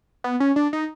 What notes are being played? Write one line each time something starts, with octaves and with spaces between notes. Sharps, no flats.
B3
C#4
D4
D#4